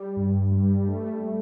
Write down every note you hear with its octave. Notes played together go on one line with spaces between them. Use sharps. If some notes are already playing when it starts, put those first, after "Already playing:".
Already playing: G3
G2
G3
A3
A3